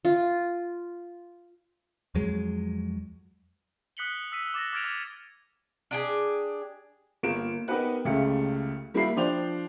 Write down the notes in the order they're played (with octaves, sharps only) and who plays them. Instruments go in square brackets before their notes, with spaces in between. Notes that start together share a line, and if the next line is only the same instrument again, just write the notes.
[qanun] F4
[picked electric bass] F2 F#3 G#3
[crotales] D#6 F#6 B6 C#7 F#7 G7
E6 B6 D#7
D6 A6 A#6
D6 F6 G#6 A6 D7 F7
D6 G#6
[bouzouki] D4 G4 G#4
[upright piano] G1 A#3 F4 D7 E7
B3 D#4 G4 A#4 B4 F#5
C#2 C#3 A3 G4 C#7
G3 A#3 E4 F#4 B5 C7
F3 D4 C5 D5 G5 F7